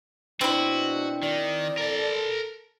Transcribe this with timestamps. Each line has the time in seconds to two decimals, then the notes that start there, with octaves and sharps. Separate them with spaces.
0.41 B2 C4 D4 E4 F#4
1.23 D#3 D5
1.77 A4 A#4 A5